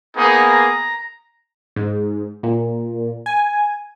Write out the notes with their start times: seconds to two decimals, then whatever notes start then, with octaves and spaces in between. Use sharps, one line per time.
0.17 A#3 B3 D#4 G#4
0.49 A#5
1.76 G#2
2.43 A#2
3.26 G#5